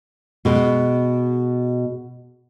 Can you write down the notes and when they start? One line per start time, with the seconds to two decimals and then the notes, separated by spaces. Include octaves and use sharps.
0.45 B2 G#3